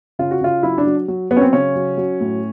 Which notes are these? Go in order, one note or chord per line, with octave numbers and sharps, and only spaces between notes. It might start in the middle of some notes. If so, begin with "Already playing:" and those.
C#3 F4
F#4
C#3 F4
F#3 E4
D4
F#3
F#3
F#3 B3
C#4
C4
C#3 C#4
F#3
F#3
A2